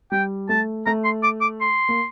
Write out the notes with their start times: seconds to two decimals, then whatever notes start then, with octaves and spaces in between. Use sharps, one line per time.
0.12 G3 G5
0.49 A3 A5
0.86 A3 A#5
1.04 C6
1.23 D6
1.41 D6
1.61 C6
1.89 A#3